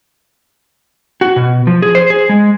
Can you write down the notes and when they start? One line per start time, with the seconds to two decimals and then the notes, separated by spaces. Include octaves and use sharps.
1.21 F#4
1.36 B2
1.67 F3
1.82 G#4
1.95 C5
2.10 G#4
2.29 G#3